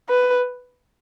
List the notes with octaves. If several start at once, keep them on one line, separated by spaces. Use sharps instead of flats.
B4